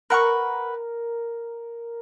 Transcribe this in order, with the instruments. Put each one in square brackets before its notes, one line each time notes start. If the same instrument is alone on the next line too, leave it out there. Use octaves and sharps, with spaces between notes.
[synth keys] A#4 [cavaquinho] B4 F#5 C#6